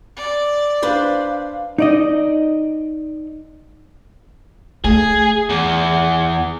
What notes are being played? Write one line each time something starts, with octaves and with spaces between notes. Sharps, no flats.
D5
D4 B4 C5 F5
D#4 D5 D#5
A3 G#4
E2